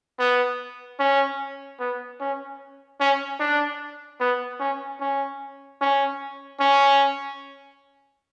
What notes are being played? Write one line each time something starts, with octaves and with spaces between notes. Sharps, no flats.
B3
C#4
B3
C#4
C#4
D4
B3
C#4
C#4
C#4
C#4